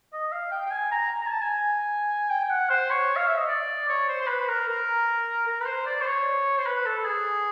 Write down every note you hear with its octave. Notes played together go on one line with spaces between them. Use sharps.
D#5
F5
G5
G5
G#5
A#5
A#5
G#5
A5
G#5
G5
G5
F#5
C5
C#5
F5
E5
D#5
D5
C#5
C5
C5
B4
A#4
A#4
A#4
B4
C5
D5
C5
C#5
C5
B4
A4
G#4